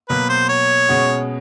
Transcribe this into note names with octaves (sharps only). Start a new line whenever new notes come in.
B2 F#3 A#3 B4
C5
C#5
B2 G#3 C#4 F#4